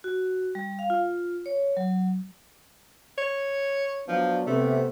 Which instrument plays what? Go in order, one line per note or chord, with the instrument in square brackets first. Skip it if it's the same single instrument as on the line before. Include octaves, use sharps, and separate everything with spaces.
[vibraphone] F#4
G3
F5
F4
C#5
F#3
[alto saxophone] C#5
[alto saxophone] F3 [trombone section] F#3 B3 D4
[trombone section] C3 B3 [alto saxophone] A3